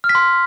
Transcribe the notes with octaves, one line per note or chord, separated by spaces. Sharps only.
F6
B6
C6